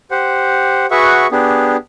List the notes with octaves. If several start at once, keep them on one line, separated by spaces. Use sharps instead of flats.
G4 C5 F#5
F#4 G#4 B4 E5 F#5 C#6
B3 D4 G4 G#4